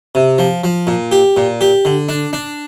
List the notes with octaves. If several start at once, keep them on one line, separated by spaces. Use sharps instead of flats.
C3
F3
F3
A#2
G4
A#2
G4
D3
D4
D4